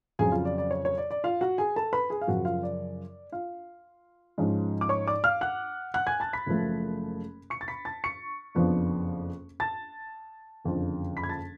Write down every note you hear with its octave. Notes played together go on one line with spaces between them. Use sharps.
F2 C#3 F#3 G#4 G#5
F4 F5
D5
D5
C#5
C#5
D5
D5
F4 F5
F#4 F#5
G#4 G#5
A4 A5
B4 B5
G#4 G#5
F5
F#2 C#3 F3 F#4 F#5
F4 F5
D5
F4 F5
G#2 F3 G#3 C#4
D6
C#5 C#6
D5 D6
F5 F6
F#5 F#6
F#5 F#6
G#5 G#6
A5 A6
B5 B6
F#1 F#2 F3 A3
C#6 C#7
A6
B5 B6
A5 A6
C#6 C#7
F#1 F2 F3 B3 D4
A5 A6
F#1 F2 D3 F3
B5 B6
G#6
A5 A6